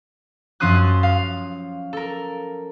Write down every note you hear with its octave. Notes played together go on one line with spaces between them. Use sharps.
F#2 F3 C#4 C6 D#6 F#6
F5
A4 A#4